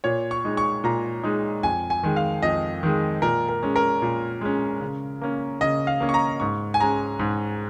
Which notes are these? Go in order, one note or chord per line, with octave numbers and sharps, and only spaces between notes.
A#2 C#5
C#6
G#3 D#4
C#6
A#2 A#5
G#3 D#4
F2 G#5
G#5
D#3 G#3
F5
F2 D#5
D#3 G#3
A#2 A#4
A#4
G#3 C#4
A#4
A#2
G#3 C#4
C#3
A#3 C#4
C#3 D#5
F5
A#3 C#4
C#6
A#5
G#2 C#6
G#5
G#3 C#4 A#5
G#2